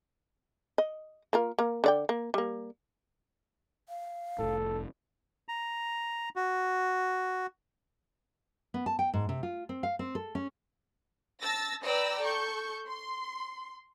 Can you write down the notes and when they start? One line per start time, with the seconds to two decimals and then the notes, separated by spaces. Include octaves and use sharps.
0.78 D#5
1.33 A#3 F4 A#4
1.59 A#3 A#4
1.84 D3 D5 G5
2.09 A#3
2.34 G3 A#3
3.89 F5
4.39 F1 A2 A4
5.49 A#5
6.36 F#4
8.74 B3
8.86 A5
8.99 G5
9.14 G#2
9.29 C3
9.43 F4
9.69 C4
9.83 F5
9.99 C4
10.15 A4
10.35 C#4
11.40 A5 E6 A6 A#6
11.84 B4 D5 G5 A#5 E6 A#6
12.22 A4 C#6 G6
12.87 C6